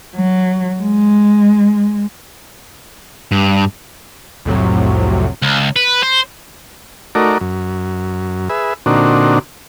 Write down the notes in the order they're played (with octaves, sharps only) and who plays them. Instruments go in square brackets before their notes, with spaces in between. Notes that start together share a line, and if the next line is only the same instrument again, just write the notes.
[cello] F#3
G#3
[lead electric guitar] G2
[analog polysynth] C2 F2 A2 C3 F#3
[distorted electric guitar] C#2
B4
C5
[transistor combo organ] A3 D#4 F#4 A#4 D5
F#2
G#4 B4 E5
A#2 D3 C4 D4 D#4 F#4